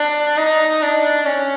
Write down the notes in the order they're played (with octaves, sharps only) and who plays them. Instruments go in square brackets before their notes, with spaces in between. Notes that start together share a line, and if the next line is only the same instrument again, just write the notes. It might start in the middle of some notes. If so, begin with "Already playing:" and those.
Already playing: [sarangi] D4
D#4
D4
C#4